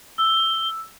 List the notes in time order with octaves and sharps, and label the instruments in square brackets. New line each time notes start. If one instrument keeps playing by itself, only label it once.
[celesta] E6 [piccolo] G7